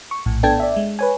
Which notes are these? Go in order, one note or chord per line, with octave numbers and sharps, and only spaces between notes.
C#6
A#1 A2
B3 D4 A4 G5 A5 G#6
D5 E5
G#3
B4 C#5 G#5